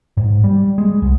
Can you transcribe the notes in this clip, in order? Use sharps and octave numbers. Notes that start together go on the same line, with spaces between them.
G#2
G3
G#3
C2